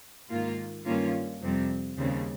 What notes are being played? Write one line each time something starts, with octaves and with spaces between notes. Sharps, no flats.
G#2 D#3 A#3 F4
G2 D#3 A#3 C#4 F4
F2 C3 G3 C4
D#2 C#3 G3 C4